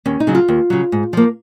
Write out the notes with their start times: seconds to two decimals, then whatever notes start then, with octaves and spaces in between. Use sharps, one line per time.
0.05 D#2 C#4
0.20 D#4
0.27 C#3 F#3
0.35 F4
0.48 D#2
0.70 C#3 F#3
0.92 G#2
1.13 F3 A#3